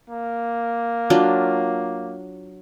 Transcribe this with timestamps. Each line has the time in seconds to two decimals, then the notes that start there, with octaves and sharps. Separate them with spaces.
0.10 A#3
1.10 F#3 D4 F4